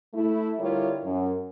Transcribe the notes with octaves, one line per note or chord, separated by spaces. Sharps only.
A3 E4
D3 G3 E4 F4 A#4 C#5
F#2